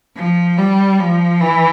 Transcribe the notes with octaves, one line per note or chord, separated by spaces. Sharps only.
F3
G3
F3
E3